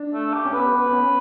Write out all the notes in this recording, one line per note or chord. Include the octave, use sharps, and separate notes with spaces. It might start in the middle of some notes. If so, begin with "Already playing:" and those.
Already playing: D4
A3
G4
C#4
B3 B4
B3
B3
C#4